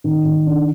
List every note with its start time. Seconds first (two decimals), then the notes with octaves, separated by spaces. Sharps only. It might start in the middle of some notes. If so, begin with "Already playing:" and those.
0.04 D#3
0.25 D#3
0.47 D4